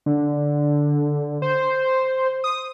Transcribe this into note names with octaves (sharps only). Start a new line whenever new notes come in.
D3
C5
D#6